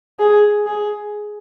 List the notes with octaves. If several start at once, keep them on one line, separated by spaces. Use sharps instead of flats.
G#4
G#4